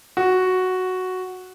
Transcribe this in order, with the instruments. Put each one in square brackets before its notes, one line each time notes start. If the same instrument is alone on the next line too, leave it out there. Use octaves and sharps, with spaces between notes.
[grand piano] F#4